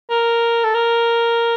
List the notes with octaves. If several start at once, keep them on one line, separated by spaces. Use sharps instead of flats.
A#4
A4
A#4